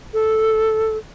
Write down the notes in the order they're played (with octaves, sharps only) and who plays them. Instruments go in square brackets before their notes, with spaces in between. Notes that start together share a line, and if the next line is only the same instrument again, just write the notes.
[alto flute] A4